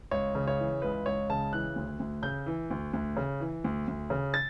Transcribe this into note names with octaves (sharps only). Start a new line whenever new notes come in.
C#2 C#5
C#3
C#5
E3
C#2 B4
C#2 C#5
C#3 A5
E3 F#6
D2
D2
C#3 G6
E3
D2
D2
C#3
E3
D2
D2
C#3
A6